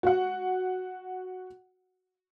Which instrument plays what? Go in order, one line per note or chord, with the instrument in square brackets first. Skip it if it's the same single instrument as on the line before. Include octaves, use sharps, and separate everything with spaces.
[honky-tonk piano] F#4 F#5